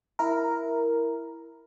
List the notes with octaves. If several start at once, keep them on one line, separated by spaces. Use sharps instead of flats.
E4 A#4